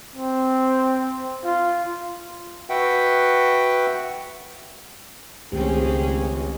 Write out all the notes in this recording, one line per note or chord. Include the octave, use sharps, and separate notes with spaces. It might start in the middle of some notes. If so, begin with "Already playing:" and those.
C4
F4
F#4 B4 E5 F#5 G5
C#2 A#2 D#3 A3 C4 C#4 G4 G#4